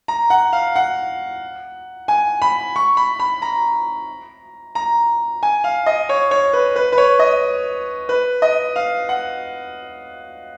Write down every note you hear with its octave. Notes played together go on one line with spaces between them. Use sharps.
A#5
F#5
F5
F#5
G#5
B5
C#6
B5
B5
A#5
A#5
G#5
F5
D#5
C#5
C#5
B4
B4
B4
C#5
D#5
B4
D#5
F5
F#5